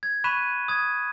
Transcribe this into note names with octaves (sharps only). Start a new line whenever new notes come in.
G#6
B5 C#6 F#6 B6 D#7 E7
D#6 G#6